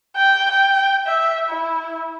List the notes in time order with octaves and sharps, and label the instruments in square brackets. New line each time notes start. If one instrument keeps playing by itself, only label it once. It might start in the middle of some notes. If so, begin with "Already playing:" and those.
[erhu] G5
G5
E5
E4